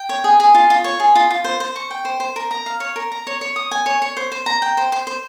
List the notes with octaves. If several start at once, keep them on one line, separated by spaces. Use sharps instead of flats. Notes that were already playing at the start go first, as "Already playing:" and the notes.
Already playing: G5
C#5
G#4
G#4
F4
F4
C#5
G#4
F4
F4
C5
C5
C#6
G5
C5
C5
A#4
A#5
F5
C#5
A#4
A#5
C#5
C#5
D#6
G#5
C#5
C#5
C5
C5
A#5
G5
C5
C5
C5